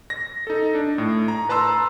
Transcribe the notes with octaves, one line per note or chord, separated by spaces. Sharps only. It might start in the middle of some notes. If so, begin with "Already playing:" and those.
A#6
D#4 A4
D4
A2
A#5
B4 A5 A#5 C6 E6